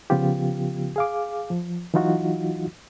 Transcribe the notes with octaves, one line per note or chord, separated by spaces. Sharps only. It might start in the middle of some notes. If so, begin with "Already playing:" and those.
C#3 F3 B3 F4 G4
G#4 F5 D6
F3
E3 F#3 D#4 F4 F#4